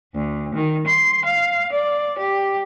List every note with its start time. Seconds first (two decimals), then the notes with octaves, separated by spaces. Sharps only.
0.15 D2
0.55 D#3
0.87 C6
1.26 F5
1.73 D5
2.19 G4